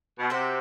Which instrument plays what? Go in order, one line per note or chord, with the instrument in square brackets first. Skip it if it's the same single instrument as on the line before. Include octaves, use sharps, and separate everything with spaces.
[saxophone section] B2
[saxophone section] C3 [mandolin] F#4 C5 E5